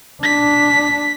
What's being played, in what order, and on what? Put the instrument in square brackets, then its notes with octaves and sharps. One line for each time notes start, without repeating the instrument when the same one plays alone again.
[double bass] D4 [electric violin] B6